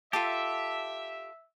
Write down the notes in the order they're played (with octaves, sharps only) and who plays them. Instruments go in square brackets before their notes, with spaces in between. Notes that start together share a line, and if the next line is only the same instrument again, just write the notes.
[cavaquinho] F4 A4 A5 [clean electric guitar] G4 [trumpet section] E5